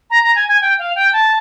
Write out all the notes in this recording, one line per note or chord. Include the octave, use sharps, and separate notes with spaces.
A#5
A#5
G#5
G#5
G5
F5
G5
A5